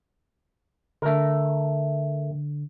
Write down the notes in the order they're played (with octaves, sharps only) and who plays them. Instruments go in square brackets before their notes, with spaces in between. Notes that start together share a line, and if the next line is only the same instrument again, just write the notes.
[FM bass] D3 [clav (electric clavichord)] A3 A#4